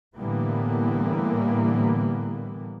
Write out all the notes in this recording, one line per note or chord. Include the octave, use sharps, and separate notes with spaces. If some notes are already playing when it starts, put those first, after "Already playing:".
A2 D3 E3 G3 A#3 B3